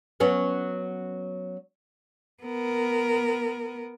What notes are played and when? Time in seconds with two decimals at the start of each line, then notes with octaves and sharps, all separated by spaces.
0.20 F#3 B3 C#4
2.43 B3 A#4